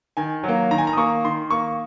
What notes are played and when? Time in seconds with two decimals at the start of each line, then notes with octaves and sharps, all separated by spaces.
0.17 D#3 G#5
0.44 F#3 A#3
0.71 D#3 A#5
0.78 G#5
0.87 A#5
0.93 D#6
0.97 A#3 C#6
1.24 D#3 C6
1.51 A#3 C#6